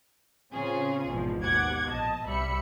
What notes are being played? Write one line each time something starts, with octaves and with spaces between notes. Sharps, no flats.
A2 C#3 C4 C#4 F4 G#4
G#1 E2 B2 F3
D#2 B2 F#5 D6 G#6
A#1 D#5 A5
C2 G3 E5 B5 C#7